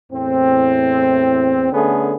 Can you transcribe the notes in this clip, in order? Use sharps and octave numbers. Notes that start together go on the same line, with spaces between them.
E2 A2 C4
D3 A3 B3 C#4 G#4